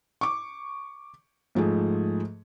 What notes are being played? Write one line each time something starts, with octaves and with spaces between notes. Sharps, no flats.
C#6 D6
G#2 F3 A3 G#4